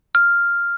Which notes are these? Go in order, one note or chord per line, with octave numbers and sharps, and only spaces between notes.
F6